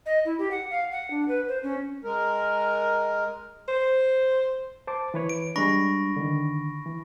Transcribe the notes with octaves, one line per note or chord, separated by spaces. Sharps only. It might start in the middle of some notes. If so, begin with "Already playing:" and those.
D#5
E4
G4
F#5
F5
F#5
D4
B4
C5
C#4
G#3 A#4
C5
C5 A5 D6
E3 B4 C#5
D7
G3 G#3 D4 B5 C#6 A#6
D3 D#3
E3